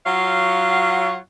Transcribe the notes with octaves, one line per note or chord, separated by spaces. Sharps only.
F#3 F4 C#5 F5 F#5